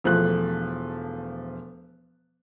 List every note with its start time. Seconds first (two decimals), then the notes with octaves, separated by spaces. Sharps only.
0.04 E1 F3 A3 F#6